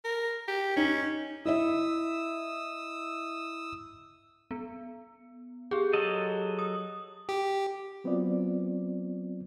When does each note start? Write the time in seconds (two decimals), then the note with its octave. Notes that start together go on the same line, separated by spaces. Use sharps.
0.05 A#4
0.48 G4
0.77 C#4 D#4
1.45 E4 D#5 E5 D#6 E6
4.51 B3
5.71 G4 G#4
5.93 F#3 A4 D#5
6.59 D#6
7.29 G4
8.04 F#3 B3 C4 F4 D5